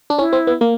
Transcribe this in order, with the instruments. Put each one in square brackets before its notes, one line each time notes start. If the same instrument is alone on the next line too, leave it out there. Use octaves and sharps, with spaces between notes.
[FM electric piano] D4
[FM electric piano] C#4 [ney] E4
[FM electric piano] C4
B3
A#3